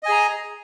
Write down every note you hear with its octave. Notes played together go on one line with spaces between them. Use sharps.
G#4 D#5 G#5 A#5